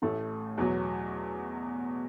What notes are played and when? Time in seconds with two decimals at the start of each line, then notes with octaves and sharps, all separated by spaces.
0.02 A1 A2 A3
0.57 E2 B2 F#3